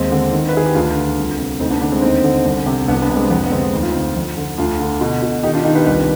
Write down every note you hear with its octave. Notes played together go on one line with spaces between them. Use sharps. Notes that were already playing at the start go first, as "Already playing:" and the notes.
Already playing: D#2 G#3 C4
D3
D#3
B4
D#3 G#4
G4
D2 D4 F4
D3
C2
C3
D2 C4 D#4
B3 D4
D3 B3 D4
G#3 C4
D#2 C4 D#4
D3
C2
C3
C2 B3 D4
B3 D4
C3
G#3 C4
F2 B3
B3
D3 G#3 C4
D2 D#4
F4
D3 C4 D#4
F2
D3
D2 D4 F4
D3
B2
B2
D#3 D#4 G4
D4 F4
D#3 D#4 G4
G4 B4
C2 G4 B4